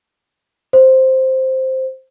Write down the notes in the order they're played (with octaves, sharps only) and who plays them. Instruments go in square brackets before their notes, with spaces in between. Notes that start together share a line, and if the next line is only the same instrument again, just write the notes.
[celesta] C5